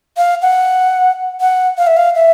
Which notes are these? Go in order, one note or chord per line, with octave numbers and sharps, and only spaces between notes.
F5
F#5
F#5
F5
E5
F5
E5